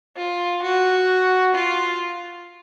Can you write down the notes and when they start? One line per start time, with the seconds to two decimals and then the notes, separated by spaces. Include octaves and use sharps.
0.16 F4
0.62 F#4
1.54 F4